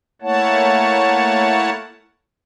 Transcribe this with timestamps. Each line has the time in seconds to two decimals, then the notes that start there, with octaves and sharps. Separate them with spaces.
0.22 A3 A#3 E4 C#5 F#5 A5